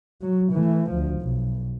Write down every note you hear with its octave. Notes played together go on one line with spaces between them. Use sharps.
F#3
E3 A3
D2 F3
B1